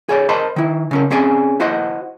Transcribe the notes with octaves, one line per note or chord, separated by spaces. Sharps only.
G#4 C#5 D5
A#4 C5 D#5 A5 B5
D#3 E4
C#3 C#4 A#4
C4 C#4 G#4 D5 G#5
E4 F#4 C5 D#5 F#5